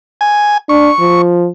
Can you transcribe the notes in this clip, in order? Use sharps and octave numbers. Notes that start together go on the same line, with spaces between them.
G#5
D4 C#6
F3